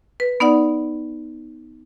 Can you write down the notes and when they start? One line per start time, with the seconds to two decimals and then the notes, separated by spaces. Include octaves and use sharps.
0.20 B4
0.40 B3 D#4 D5 F#5